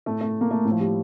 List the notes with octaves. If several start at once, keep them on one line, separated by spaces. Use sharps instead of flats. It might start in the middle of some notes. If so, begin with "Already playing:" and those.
A2 A3
A3
A#3
A3
A2
F3
G3